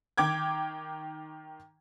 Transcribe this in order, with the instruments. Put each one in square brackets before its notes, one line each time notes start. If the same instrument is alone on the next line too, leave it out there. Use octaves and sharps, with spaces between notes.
[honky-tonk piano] D#3 G5 D6 G#6